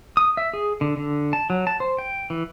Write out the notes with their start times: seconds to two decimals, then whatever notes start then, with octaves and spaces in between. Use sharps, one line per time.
0.17 D#6
0.37 E5
0.53 G#4
0.81 D3
0.97 D3
1.33 A5
1.50 F#3
1.67 A5
1.80 C5
1.99 G5
2.30 E3